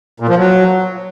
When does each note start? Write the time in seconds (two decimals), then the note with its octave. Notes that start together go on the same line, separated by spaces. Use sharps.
0.20 A#2
0.29 F3
0.38 F#3